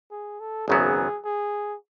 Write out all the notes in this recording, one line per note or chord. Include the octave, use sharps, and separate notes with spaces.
G#4
A4
G#1 F#2 C#3 F#3 B3 G#4
G#4